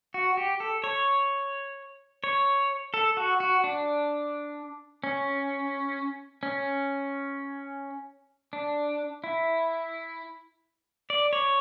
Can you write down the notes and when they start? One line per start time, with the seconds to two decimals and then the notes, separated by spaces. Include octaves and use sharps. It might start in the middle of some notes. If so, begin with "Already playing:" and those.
0.14 F#4
0.37 G4
0.60 A4
0.84 C#5
2.24 C#5
2.94 A4
3.17 F#4
3.40 F#4
3.64 D4
5.04 C#4
6.43 C#4
8.53 D4
9.24 E4
11.10 D5
11.33 C#5